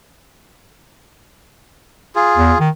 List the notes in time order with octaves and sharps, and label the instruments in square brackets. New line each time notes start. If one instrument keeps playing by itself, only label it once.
[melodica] F4 G#4
[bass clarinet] E2
D#3